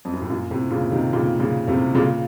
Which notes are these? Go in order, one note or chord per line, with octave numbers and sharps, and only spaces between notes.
F2
F#2
A2
F#2 A#2
A2 C3
A#2 C#3
C3 D#3
A#2 C#3
A#2 C#3
A2 C3
A#2 C#3